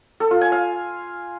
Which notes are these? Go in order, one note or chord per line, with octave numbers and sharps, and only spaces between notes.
A4
F4
G#5
F5